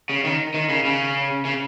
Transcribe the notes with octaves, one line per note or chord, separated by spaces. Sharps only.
C#3
D#3
D#3
C#3
C#3
C#3